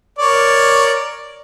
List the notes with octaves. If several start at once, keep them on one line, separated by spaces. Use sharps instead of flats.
A#4 C#5 D5